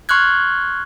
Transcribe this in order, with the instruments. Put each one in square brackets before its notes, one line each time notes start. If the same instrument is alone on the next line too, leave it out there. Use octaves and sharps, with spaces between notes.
[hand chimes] C6 C#6 F6 F#6 G#6